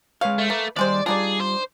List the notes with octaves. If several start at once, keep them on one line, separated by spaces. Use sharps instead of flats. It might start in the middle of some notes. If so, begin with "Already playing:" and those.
G#3 B4 C#5 F5
A3
A3 A#3 B4
D#2 C3 G3 G#3 C5 D5
G3 D4 D#4 F4 G#4 D5
C5